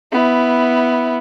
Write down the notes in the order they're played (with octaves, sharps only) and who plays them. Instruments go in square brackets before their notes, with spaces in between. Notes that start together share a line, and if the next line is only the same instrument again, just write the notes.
[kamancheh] B3 E4